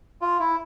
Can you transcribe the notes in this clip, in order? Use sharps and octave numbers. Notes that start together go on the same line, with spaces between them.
F4
E4